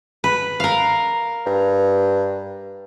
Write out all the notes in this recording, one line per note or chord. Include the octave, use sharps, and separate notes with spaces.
B4
A#4 F5
G2